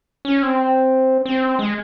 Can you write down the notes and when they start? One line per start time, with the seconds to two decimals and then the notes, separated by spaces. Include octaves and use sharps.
0.25 C#4
0.43 C4
1.25 C4
1.59 G#3